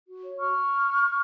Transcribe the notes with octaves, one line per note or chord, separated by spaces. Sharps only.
F#4
C#5
F#4 C#6 F6